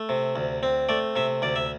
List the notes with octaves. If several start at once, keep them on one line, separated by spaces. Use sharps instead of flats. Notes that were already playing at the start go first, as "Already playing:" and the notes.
Already playing: A3
C3
D2
C4
A3 D5
C3 E5
D2 D5
E5